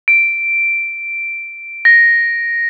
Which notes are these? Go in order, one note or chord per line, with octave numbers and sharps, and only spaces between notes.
D7
A#6